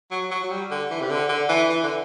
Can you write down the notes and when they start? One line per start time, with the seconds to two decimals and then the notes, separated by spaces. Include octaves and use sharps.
0.11 F#3
0.31 F#3
0.44 F#3
0.50 G3
0.71 D3
0.90 E3
1.01 C3
1.10 D3
1.29 D3
1.49 E3
1.70 E3
1.83 D3